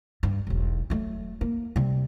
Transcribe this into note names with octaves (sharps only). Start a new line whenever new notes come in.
G2
E1 B1
F#3 A3
A#3
C3 G3